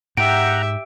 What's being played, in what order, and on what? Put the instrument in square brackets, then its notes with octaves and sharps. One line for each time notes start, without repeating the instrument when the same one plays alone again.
[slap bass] G#2 [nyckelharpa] G4 E5 [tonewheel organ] F#5 G5 A#5 [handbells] D7